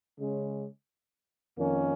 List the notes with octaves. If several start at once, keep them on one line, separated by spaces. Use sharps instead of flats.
C#3 G#3 C#4
F2 D#3 A#3 C#4